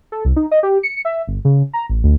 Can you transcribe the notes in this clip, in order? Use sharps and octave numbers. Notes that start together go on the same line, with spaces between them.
A4
C2
D#4
D#5
G4
C#7
E5
G1
C#3
A#5
A1
D2